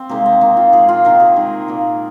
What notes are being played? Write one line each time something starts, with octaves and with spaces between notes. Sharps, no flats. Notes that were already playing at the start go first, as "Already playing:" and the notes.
Already playing: C4
C3 D#3 G#3 A#3
C4
D#3 A#3 D#4
F4
A#2 F3 G#3 G#4
F4
C3 D#3 A#3 A#4
G#4
D#3 G#3
A#2 A#3